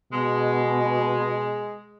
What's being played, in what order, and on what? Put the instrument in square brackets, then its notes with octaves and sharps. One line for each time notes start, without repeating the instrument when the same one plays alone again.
[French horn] B2 [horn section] G#3